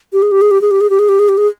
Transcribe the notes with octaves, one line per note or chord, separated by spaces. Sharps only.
G4
G#4
G4
G#4
G4
G#4
G4
G#4
G4
G#4
G4
G#4
G4
G#4